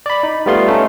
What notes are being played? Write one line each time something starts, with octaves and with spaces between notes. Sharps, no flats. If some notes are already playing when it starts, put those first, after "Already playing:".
D5 B5
D#4
G3 A3 B3 F4 C6
A3 C#4 D#4